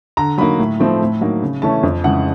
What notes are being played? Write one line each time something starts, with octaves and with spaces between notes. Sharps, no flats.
D3 A#5
F#3 A#3 D#4 B5
A2
F3 A3 C4 D#4
A2
F#3 A#3 D#4
C#3
E3 A3 C#4 A5
F2
C#3 E3 G#3 F#5